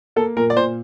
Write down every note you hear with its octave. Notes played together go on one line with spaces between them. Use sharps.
A#3 A4
A#2 A#4
D5
A#2 C5